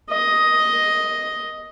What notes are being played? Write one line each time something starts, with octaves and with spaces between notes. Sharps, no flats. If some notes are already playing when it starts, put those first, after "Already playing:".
D#5